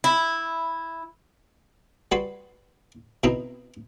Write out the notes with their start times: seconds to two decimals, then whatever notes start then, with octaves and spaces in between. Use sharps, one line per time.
0.04 E4
2.12 G3 F#4 B4 C6
3.23 B2 C4 D#4 E4 C5 A#5